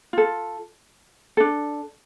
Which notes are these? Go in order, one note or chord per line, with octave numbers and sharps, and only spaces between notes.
F4 A4
D4 A4